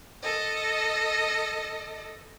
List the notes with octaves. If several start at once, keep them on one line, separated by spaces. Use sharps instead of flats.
A4 D#5